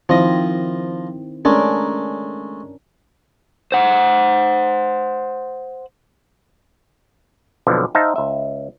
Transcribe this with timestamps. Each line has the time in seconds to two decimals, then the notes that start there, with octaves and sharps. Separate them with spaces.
0.09 D#3 F3 C4 E4 D#5
1.45 G#3 A3 C#4 D4 A#4
3.72 C5 F#5
7.67 B1 F2 B2 D3 F3
7.95 D#4 C5 E5 F5 A5
8.16 C#2 E5